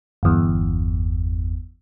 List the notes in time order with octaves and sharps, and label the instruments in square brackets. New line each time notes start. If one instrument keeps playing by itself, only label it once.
[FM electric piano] G1 E2